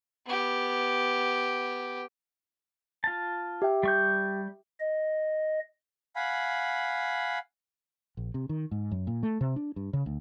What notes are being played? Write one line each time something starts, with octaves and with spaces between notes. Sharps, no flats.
B3 G4
F4 A5
G4 E5 G5
G3 C#6 G6
D#5
F5 F#5 G#5 B5
A#1
C3
D#3
G#2
F#2
A#2
A3
C3
D4
G2
C#3
D2